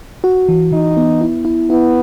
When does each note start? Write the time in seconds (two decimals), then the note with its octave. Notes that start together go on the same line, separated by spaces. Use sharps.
0.24 F#4
0.49 E3
0.72 E3 D#4
0.97 B3
1.21 E4
1.45 E4
1.70 B3 E4